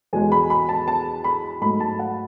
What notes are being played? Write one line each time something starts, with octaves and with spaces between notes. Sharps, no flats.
E2 B2 G#3 G#5
B5
B5
A5
A5
B5
G#2 F#3 A3 B5
A5
F#5